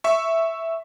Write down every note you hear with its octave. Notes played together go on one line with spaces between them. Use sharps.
E5 C#6